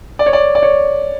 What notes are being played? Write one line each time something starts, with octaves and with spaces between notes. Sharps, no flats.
D5
C#5
D5
D5
C#5